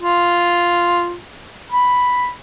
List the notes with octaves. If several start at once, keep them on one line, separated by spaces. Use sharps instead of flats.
F4
B5